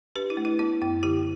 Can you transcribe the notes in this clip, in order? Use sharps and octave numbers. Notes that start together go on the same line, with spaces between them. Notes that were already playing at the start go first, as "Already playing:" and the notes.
D4 G4 B4
E4
A3
E4
B3 E4
F#2 E4
D3 E4 G4